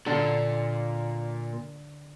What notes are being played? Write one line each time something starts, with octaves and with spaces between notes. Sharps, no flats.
A#2 D3